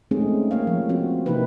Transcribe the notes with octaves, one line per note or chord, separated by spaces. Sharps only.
G#3 A3 C4 C#4 D#4 G#4
A#3 C#5 F5
F3
C4 F#4
C3 E3 A#3 D#4 E4 B4